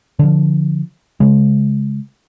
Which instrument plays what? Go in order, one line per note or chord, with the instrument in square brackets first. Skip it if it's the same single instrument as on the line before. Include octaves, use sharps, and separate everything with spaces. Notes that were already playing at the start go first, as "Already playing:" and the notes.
[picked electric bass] D3 F3
C#3 G#3